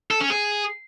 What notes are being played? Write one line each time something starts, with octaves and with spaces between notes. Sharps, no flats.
A4
C#4
G#4